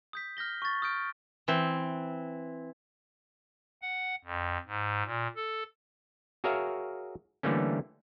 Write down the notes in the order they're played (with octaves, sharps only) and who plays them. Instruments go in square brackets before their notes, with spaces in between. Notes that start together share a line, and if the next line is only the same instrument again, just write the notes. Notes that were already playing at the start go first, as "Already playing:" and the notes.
[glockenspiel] D#6 G6 B6
F6 G6 A#6 G7
C#6 A6
D#6 F6 G6 D7
[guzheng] E3 C4
[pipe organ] F#5
F2
G#2
A#2
A4
[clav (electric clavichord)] F#4 G#4 A#4 C#5 E5 F5
D3 E3 G3 A3 A#3 C#4